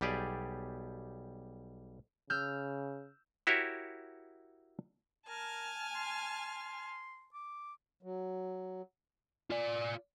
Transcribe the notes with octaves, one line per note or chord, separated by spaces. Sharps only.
B1 G3 G4 G#4 D5
C#3 E6 F6 G6
E4 F#4 G4 A#4 C#5 E5
A#4 G#5 A5 F6
C6
D6
F#3
F4 D5